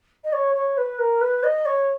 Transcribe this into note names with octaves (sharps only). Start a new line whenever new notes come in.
D#5
C#5
C#5
B4
A#4
B4
D#5
C#5